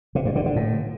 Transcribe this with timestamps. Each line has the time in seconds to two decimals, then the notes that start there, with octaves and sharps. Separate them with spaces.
0.15 C3
0.25 G2
0.36 D3
0.46 D3
0.56 A2